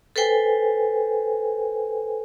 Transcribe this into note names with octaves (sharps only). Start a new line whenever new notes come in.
A4 B4 C5 G5 G#5